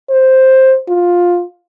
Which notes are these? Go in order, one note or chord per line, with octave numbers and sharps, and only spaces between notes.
C5
F4